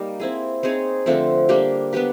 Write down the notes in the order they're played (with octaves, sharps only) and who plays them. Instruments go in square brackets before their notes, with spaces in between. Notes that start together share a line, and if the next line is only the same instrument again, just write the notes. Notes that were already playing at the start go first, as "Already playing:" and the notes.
Already playing: [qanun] G3 A#3 D#4
C4 E4 G#4
C4 D#4 G#4 C#5
D3 F3 A3 C4
G3 A#3 D4 G4
B3 D4 G4 B4